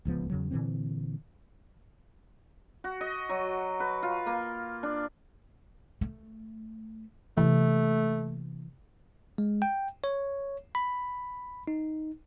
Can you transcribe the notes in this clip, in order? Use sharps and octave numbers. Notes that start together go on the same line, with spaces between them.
D1 C#2 F3 B3
E2 C#3 F#3
A#2 D3 E3 C4
F#4
D#5
F#3
B4
F4
A#3
D4
A3
C3 E3 A3 A#3
G#3
G5
C#5
B5
D#4